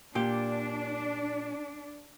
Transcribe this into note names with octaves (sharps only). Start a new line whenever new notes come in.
A#2 D4 G4